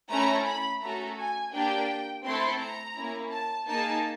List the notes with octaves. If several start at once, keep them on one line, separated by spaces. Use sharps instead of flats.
A3 C#4 E4 A4 A#5
B5
A3 C#4 F#4 A4 A#5
G#5
A#3 D4 G4 G5
A3 C4 E4 A4 C6
A#5
A#3 C#4 E4
A5
A#3 D#4 G#4 A5